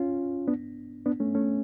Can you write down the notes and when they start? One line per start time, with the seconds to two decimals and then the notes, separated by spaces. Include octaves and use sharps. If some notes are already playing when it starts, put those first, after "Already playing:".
Already playing: C#4 F4
0.47 B3 D4
1.06 B3 D4
1.20 A3 C#4
1.35 A3 C#4